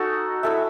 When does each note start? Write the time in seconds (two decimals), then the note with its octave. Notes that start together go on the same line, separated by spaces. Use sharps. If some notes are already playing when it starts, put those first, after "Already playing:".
Already playing: D#4 F#4 A4
0.43 E4 A4 E5